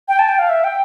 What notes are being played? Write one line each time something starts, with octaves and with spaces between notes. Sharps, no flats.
G5
A5
G5
F5
E5
G5